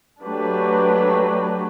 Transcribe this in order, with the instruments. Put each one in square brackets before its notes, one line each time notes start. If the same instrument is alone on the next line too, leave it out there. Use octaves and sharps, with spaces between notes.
[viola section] F#3 A3 D4 G4 B4